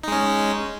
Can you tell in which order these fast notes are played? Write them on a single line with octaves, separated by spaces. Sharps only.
D#4 G#3 C#4